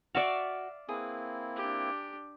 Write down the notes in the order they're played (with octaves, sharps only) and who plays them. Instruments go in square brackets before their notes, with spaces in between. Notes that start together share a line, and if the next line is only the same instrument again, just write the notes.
[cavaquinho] F#4 C#6 [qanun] D5 E5 F5
[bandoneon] A#3 C4 E4 [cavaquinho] G#4 B4
[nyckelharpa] D4 G4